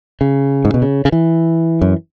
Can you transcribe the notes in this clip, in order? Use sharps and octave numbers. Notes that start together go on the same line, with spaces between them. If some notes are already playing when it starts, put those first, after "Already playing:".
C#3
G#2
B2
C#3
C#3
E3
F#2